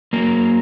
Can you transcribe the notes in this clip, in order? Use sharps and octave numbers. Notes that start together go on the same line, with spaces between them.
F#3 A#3